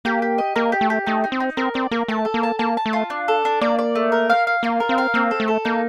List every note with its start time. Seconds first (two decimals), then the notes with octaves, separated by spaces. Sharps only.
0.05 A#3 G4
0.22 G4
0.38 D#5
0.56 A#3 A#4
0.72 G4
0.81 A3
0.90 G4
1.07 A3 D#4
1.24 D#4
1.32 C4
1.40 D#4
1.57 C4 A#4
1.74 C4 D5
1.91 A#3 A#4
2.08 A3 A5
2.25 A4
2.34 A#3
2.43 A5
2.59 A#3 A5
2.77 A5
2.86 A3
2.93 F4
3.10 D4
3.28 A4
3.45 D4
3.61 A#3 D5
3.79 D5
3.95 A3
4.12 A#4
4.30 F5
4.47 F5
4.63 A#3 F4
4.80 A#4
4.89 C4
4.98 F5
5.14 A#3 C4
5.31 A4
5.40 A3
5.48 A4
5.65 A#3 D#4